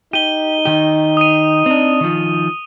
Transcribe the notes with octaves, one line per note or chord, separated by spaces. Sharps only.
D#4 G4 D#7 G7
D#3 G4
D#6 D#7
C4 D4
D#3 F3